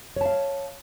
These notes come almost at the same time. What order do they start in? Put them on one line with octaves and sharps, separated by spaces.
C#5 A5 F5